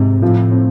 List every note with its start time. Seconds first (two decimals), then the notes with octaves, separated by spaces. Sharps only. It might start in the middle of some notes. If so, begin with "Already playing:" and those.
Already playing: G#2 C3
0.22 A2 F3
0.52 C4